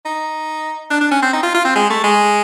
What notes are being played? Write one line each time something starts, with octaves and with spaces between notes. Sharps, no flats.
D#4
D4
D4
C#4
C4
D#4
F4
F4
C4
G#3
A3
G#3